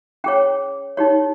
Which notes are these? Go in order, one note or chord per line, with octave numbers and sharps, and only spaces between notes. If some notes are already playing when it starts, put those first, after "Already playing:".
C#4 G#4 C#5 G5
D#4 G4 C#5